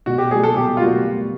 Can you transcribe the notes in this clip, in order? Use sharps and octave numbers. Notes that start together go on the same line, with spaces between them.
B2 F#4
G4
G3 A#3 G#4
A4
B2 G4
F4
G3 A#3 F#4